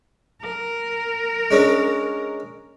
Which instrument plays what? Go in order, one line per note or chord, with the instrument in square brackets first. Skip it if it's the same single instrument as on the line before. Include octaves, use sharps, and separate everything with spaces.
[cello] A#4
[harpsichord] G#3 C#4 D4